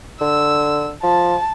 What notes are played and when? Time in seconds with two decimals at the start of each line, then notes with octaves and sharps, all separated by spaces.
0.21 D3 E6
1.03 F3 A5